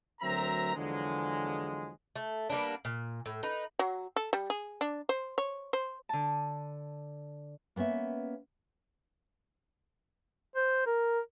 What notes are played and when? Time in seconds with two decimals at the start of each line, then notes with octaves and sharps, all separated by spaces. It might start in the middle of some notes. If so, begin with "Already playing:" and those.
0.21 D2 F#3 C4 A#4 E5 A#5
0.76 E2 D3 F3 F#3 G#3
2.16 A3
2.50 G3 A#3 B3 D4
2.85 A#2
3.26 A2
3.43 D#4 B4
3.79 F#3
4.16 A4
4.33 G3
4.50 G#4
4.81 D4
5.09 C5
5.38 C#5
5.73 C5
6.09 D3 A5
7.76 A#3 B3 C#4 E5
10.56 C5
10.87 A#4